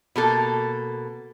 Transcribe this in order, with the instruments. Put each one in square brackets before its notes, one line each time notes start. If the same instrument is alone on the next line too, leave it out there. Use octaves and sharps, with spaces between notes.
[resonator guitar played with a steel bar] B2 A#3 A4